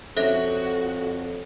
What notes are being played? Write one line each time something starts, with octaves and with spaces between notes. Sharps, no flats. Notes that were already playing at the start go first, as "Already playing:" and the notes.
F2 F#4 A4 C5 C#5 E5 A#6